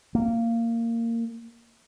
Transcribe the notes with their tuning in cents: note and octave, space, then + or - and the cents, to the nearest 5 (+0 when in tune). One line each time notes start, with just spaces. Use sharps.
A#3 -15